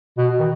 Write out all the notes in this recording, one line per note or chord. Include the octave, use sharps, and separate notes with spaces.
B2
D#3